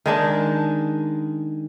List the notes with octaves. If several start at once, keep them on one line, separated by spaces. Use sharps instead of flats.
D#3 G#3 D4